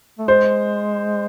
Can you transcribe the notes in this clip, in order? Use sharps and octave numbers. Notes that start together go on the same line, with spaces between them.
A3
G#3 C5